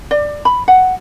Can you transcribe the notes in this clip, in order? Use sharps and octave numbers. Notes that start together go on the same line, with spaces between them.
D5
B5
F#5